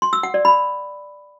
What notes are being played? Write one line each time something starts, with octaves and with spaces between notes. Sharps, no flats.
C6
E6
F#5
D5
B5